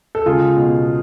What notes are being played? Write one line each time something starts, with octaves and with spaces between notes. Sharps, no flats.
A4
C#2 F4 G#4
B2